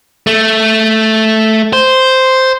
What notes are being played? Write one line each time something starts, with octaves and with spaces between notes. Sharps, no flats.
A3
C5